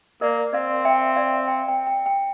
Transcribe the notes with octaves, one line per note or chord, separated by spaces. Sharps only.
A#3 A#4 D5
C4 D5 F5
E5 G5
D5 F5
G5
G5
G5
G5